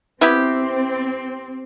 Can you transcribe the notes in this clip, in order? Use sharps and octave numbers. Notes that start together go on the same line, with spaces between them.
B3 C4 E4 G4